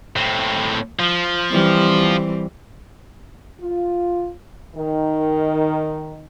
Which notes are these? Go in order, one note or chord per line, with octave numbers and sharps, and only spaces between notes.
A2 C4
F3
E3 G3 C4
F4
D#3